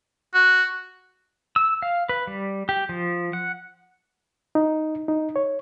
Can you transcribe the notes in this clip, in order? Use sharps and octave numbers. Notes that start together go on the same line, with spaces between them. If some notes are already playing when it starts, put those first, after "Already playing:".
F#4
E6
F5
B4
G3
G4
F3
F#5
D#4
D#4
C#5